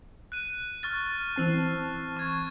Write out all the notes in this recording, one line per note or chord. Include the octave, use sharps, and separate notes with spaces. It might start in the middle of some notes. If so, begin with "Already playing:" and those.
F#6 D#7
C#6 F6 A6
E3 C4 A5
C#6 G#6